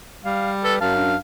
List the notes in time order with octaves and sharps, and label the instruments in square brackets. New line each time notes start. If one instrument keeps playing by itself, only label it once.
[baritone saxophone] G3 [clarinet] F5
[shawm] A4 [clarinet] B4
[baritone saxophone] F#2 [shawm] F5 [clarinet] A5
[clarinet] D4